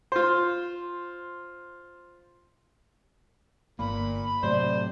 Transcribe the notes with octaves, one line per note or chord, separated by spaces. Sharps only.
F4 C5
G1 A#2 A#3 B5
A2 C3 F#3 C5 D5